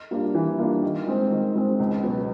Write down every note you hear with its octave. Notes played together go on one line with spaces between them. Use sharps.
G3 A#3 D4 F4
E3
G3 A#3 D4 F4
D#3
G#3 C4
D#3
G#3 C4
C#2
B2 F#3 B3